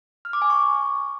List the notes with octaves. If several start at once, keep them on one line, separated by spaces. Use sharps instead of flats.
F6
D6
G#5
C#6